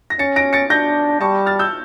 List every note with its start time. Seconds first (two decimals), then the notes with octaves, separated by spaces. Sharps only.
0.10 A#6
0.19 C#4 A6 C#7
0.36 A#6 D7
0.53 A6 C#7
0.70 D4 G6 A#6
1.21 G3 A5 C#6
1.46 F6 A6
1.59 E6 G6